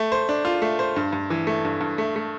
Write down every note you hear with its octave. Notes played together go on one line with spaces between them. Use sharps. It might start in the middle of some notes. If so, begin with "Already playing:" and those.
Already playing: A3
C5
D4
F4
A3
C5
G2
G2
E3
A3
G2
G2
A3
A3